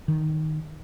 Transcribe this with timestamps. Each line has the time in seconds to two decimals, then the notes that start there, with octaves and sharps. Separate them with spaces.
0.08 D#3